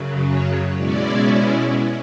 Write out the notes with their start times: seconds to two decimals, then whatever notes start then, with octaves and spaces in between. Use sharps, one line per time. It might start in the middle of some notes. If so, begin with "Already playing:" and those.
Already playing: F#2 C#3 F#3
0.27 C#5
0.76 B2 G#3 C#4 E4 D5